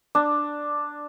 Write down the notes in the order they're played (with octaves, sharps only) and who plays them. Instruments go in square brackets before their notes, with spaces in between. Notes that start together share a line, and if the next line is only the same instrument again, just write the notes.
[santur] D4